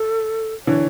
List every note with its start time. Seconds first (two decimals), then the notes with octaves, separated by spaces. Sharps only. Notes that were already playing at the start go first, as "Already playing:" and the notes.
Already playing: A4
0.66 D3 E3 C#5